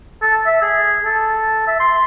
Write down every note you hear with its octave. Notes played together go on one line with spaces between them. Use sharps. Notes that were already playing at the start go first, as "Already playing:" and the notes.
A4
E5
G#4
A4
E5
C6